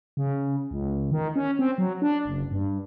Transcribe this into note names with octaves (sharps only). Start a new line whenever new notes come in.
C#3
C#2
D#3
C#4
C4
F#3
D4
F#1
G2